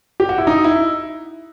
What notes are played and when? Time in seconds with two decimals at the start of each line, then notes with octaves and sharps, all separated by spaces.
0.20 G4
0.29 F#4
0.38 E4
0.47 D#4
0.64 E4